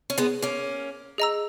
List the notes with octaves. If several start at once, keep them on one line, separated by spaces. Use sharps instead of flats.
C#4
G#3 B3
A#3 C#4
G#4 D#5 A#5 E6